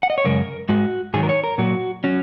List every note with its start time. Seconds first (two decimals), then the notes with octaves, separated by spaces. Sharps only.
0.03 F#5
0.10 D#5
0.18 C#5
0.25 F#2 C#3 G#3 A#4
0.69 G#2 G#3 F#4
1.14 G#2 D#3 F#3 G#4
1.23 A#4
1.29 C#5
1.44 A#4
1.58 A#2 F#3 F#4
2.04 F#3 C#4